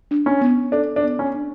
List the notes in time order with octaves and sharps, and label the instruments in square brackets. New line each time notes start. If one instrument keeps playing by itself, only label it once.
[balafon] D4
[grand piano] C#4
[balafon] B3
[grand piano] D4 [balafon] A4
[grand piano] D4
[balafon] B3
[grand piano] C#4
[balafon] D4